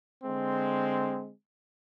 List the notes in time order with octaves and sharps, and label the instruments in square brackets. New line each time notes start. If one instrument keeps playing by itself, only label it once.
[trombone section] D3 G#3 C4